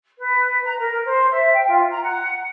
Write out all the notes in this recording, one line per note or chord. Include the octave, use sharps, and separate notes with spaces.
B4
A#5
A#4
C5
E5
G5
F4
A#5
F#5